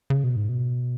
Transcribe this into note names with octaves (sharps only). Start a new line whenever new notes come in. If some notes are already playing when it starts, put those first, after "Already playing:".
C#3
B2
G#2
B2